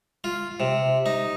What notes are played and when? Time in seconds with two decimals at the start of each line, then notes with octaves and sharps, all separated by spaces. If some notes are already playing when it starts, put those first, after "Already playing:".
0.24 F4
0.60 C3
1.06 D#4